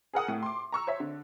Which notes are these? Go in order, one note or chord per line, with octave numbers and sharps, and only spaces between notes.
G#4 A#4 F#5 D#6
A2
C6 D6
A#5 C#6 E6
C5 C#5 E5
D3